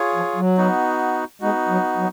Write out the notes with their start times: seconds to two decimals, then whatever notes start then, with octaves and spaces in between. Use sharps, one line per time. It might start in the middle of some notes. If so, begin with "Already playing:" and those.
Already playing: F4 G#4 C#5
0.15 F3
0.36 F#3
0.57 B3 D#4 F#4
1.41 G#3 B3 D#4 F#4
1.69 F#3
1.97 F#3